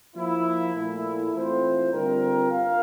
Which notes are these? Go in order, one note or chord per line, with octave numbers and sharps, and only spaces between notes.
F3 A#3 E4
A#2 A3 E4
E3 A3 C4 F4 C5
D3 G3 C4 F4 A#4
F4 A#4 F5